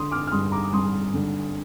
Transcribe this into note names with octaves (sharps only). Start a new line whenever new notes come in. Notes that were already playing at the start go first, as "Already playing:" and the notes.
Already playing: D3 C6 D#6
D6 F6
F6
G2 C6 D#6
A#5 D6
D6
G2 C6 D#6
D3